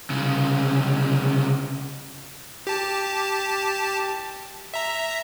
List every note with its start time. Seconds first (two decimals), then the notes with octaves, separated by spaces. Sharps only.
0.10 C2 C#3
2.67 G4 A5
4.74 E5 A#5